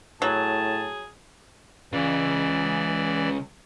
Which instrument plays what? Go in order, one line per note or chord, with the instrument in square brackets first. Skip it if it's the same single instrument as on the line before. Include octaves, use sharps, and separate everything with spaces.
[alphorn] A2 [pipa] F#3 [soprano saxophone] G#4 [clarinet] A5
[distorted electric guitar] C#3 G#3 [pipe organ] E3 D5